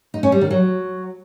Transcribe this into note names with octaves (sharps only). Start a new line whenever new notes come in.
D#4
C#4
G3
D#3
F#3